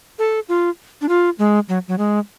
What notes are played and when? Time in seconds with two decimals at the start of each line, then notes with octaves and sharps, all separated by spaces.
0.19 A4
0.49 F4
1.01 D4
1.09 F4
1.39 G#3
1.69 F#3
1.88 F#3
1.98 G#3